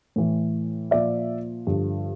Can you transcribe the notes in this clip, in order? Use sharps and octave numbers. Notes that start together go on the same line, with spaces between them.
A2 E3
A#2 F3 D5 E5
G2 D3 F3